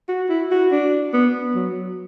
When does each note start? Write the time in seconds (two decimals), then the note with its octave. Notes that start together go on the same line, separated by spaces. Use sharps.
0.09 F#4
0.29 E4
0.51 F#4
0.72 D4
1.14 B3
1.55 F#3